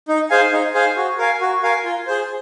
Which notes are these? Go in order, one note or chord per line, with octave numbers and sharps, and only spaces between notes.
D#4
G#4 C5 F5 G#5
D#4
G#4 C5 F5 G#5
F#4
A#4 F5 G#5
F#4
A#4 F5 G#5
F4
G#4 C5